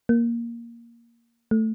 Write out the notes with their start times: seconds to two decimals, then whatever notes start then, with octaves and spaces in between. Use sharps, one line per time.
0.09 A#3
1.51 A3